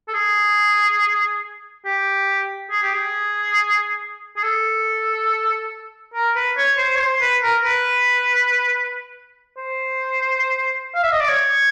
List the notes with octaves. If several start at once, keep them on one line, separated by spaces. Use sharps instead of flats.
A4
G#4
G4
G#4
G4
G#4
G#4
A4
A#4
B4
C#5
C5
C#5
C5
B4
A#4
B4
C5
F5
E5
D#5
D5
C#5